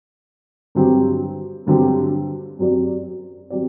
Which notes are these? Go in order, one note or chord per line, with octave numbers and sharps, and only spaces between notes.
G2 D3 F#3 C4 G4
G2 D3 F#3 C4 G4
F#2 F#3 C4 G4 D5
F#3 C4 G4 D5